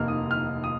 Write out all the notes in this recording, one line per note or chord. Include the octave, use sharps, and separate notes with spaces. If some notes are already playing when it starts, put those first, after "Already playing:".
Already playing: F1 D#2 D#3 A#3 F6
D#6
F6
D#6